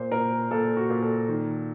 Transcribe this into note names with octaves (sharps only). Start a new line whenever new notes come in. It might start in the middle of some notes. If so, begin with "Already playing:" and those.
Already playing: A#2 C5
A#2 A#4
A#2 A4
F#4
A#2
A4
D#3